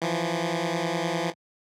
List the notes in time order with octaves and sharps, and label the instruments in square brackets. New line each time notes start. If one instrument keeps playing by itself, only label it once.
[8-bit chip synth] E3 F3